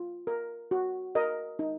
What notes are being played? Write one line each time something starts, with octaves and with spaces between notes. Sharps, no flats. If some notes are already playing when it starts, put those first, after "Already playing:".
Already playing: F4
A#4
F#4
A#4 D#5
D#4